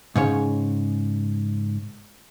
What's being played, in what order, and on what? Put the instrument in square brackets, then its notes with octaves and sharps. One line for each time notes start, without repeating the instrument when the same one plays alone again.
[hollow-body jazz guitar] G#2 C#3 C#5